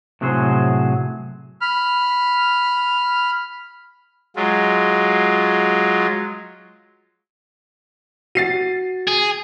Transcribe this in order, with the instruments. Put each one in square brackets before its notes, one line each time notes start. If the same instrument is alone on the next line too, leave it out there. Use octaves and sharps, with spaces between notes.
[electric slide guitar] A2 C3 F#3 G#4 C5
[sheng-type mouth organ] B5 F6
[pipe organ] F#3 G#3 F4
[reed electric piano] F#4 [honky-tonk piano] A6 C7 D#7
[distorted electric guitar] G#4